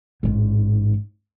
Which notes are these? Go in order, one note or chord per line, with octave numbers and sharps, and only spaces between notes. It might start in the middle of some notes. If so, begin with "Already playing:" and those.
A1 G#2